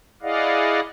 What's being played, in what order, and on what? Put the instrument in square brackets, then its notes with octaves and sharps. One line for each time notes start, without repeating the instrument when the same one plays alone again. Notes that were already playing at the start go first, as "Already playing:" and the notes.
[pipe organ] E4 G#4 D5 D#5 F5 F#5